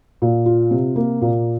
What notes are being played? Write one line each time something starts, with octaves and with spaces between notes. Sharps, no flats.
A#2
F4
C3
A#3
A#2